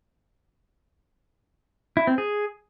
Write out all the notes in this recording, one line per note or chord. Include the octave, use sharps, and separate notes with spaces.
E4
C4
G#4